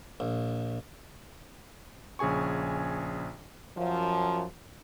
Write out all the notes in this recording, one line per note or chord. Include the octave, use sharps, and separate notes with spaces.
A#1
A#1 C#3 G#4 G#5 C#6
F#2 F3